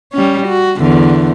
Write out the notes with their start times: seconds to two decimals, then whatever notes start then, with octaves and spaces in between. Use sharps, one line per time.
0.13 G3 C#4
0.47 F#4
0.77 E2 D3